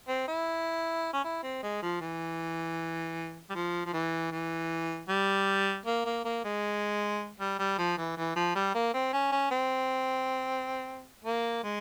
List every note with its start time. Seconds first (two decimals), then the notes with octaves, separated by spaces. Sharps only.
0.08 C4
0.28 E4
1.13 C#4
1.24 E4
1.43 C4
1.63 G#3
1.82 F3
2.01 E3
3.50 G3
3.55 F3
3.86 F3
3.93 E3
4.32 E3
5.09 G3
5.86 A#3
6.05 A#3
6.25 A#3
6.44 G#3
7.40 G3
7.59 G3
7.78 F3
7.98 E3
8.17 E3
8.36 F3
8.55 G3
8.75 A#3
8.94 C4
9.13 C#4
9.32 C#4
9.51 C4
11.25 A#3
11.64 G#3